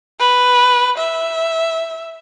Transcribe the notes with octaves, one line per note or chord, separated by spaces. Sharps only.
B4
E5